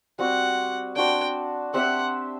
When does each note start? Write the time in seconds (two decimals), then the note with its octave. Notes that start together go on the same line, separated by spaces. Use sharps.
0.19 G3 C4 F#4 F#5
0.96 D4 F#4 C5 G5
1.74 C4 G4 C5 E5 F#5